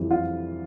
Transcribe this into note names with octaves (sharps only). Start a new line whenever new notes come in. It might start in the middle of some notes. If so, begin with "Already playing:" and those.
Already playing: F2 E3 G3
F4